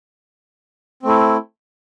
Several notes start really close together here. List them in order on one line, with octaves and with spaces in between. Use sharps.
C4 A3 E4